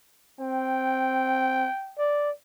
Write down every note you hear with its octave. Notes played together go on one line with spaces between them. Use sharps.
C4 G5
D5